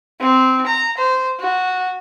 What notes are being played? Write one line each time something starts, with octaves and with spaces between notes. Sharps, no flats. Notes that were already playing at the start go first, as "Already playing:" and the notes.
C4
A#5
C5
F#4